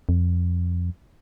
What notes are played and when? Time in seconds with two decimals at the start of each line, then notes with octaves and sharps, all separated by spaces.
0.09 F2